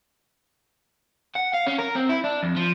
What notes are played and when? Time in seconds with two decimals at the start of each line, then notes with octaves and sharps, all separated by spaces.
1.36 F#5
1.54 F5
1.67 C#4
1.79 A#4
1.96 C4
2.09 E4
2.24 D4
2.43 F2
2.56 F3